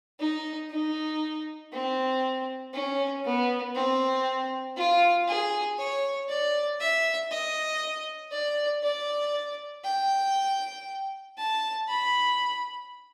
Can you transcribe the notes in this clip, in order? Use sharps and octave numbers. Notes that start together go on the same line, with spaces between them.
D#4
D#4
C4
C#4
B3
C4
F4
G#4
C#5
D5
E5
D#5
D5
D5
G5
A5
B5